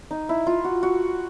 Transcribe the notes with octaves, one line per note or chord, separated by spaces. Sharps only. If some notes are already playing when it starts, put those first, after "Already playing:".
D#4
E4
F4
F#4
F#4